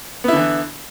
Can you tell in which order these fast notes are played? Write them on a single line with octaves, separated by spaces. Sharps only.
B3 E4 D3 E3